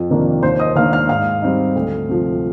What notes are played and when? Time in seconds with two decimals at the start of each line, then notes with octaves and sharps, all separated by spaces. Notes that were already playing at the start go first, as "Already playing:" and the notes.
Already playing: F2
0.10 C3 D#3 A#3 D4
0.43 D#2 C5 C6
0.60 D#5 D#6
0.76 D#3 A#3 D4 F5 F6
0.92 F5 F6
1.09 G#2 F5 F6
1.42 G3 C4 D#4
1.75 D2
2.09 C3 F3